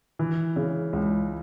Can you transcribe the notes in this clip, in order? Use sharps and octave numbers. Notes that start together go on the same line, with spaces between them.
E3
C#3
C#2